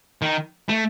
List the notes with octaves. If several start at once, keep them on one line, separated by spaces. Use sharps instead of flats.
D#3
A3